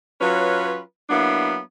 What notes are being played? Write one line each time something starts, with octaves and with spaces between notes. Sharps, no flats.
F#3 C#4 F4 B4
F#3 A#3 B3 D4 E4